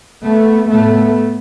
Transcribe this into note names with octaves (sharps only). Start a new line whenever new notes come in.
A3 B3
A2 A3 B3